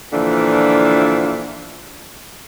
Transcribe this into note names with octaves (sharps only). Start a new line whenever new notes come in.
A#2 D3 E3 F3 D4